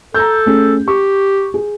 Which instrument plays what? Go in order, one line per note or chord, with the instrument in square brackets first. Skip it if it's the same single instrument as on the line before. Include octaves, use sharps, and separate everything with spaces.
[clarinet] A4 [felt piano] A#5 G6
[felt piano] A3 C#4 G#4
[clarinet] G4 [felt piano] C#6
[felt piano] G#4